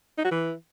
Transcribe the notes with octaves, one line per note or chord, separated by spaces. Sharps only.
D#4
F#4
E3